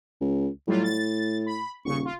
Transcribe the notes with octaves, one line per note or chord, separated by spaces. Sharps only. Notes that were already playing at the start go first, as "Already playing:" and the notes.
C#2
A2 F#3 G3 F4
A6
B5
D#1 C#3 C#6
F4